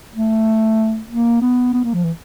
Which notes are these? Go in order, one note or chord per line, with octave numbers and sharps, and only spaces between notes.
A3
A#3
B3
B3
A#3
F3
E3